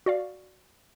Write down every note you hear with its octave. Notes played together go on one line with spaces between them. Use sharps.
F#4 D5 F5